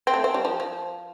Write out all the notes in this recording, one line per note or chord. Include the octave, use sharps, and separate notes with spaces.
C4
A3
C4
G3
F3
F3